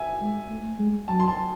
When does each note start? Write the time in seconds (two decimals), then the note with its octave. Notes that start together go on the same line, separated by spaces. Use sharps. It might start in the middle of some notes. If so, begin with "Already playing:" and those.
Already playing: E5 G#5
0.21 G#3
0.49 A3
0.79 G#3
1.08 F#3 A5
1.20 C6
1.28 A5